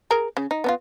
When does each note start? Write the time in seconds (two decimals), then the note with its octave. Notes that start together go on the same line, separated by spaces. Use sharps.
0.11 G#4 A#4 A#5
0.37 C#3
0.51 D#4
0.64 B3 D#4 F4